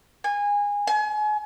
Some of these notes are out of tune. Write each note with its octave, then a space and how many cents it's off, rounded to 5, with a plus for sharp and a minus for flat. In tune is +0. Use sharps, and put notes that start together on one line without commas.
G#5 -20
G#5 +35